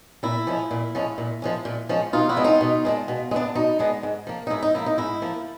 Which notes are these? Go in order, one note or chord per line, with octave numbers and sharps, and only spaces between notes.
A#2 E4
F3 G#3 C#4
A#2
F3 G#3 C#4
A#2
F3 G#3 C#4
A#2
F3 G#3 C#4
B2 D#4 F4
E4 F#4
G#3 B3 D4
D#4 F4
B2
G#3 B3 D4
B2
G#3
B3 D4
B2 D#4
G#3 B3 D4
G#2
F3 A#3
D#4
G#2 E4
D#4
F3 A#3 E4
D#4
G#2 E4
F3 A#3